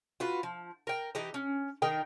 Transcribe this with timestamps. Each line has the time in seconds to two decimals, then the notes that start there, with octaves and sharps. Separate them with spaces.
0.20 F4 F#4 B4
0.43 F3
0.87 A#4 G5
1.15 E3 D#4 G4 A#5
1.34 C#4
1.82 D#3 D#4 A#4 G5